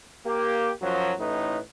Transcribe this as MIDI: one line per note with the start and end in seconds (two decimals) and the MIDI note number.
0.25 0.70 58
0.25 0.70 67
0.81 1.13 42
0.81 1.13 53
0.81 1.13 54
1.19 1.59 33
1.19 1.59 45
1.19 1.59 63
1.19 1.59 71